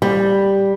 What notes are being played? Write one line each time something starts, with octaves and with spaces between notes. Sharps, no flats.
G3